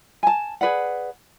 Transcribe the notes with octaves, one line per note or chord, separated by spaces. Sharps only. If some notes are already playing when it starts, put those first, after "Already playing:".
G#5 A5
G#4 B4 D5 F#5